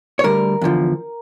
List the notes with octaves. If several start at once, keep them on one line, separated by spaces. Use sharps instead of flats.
C#5
D2 D3 G3 A#4
E2 D3 F3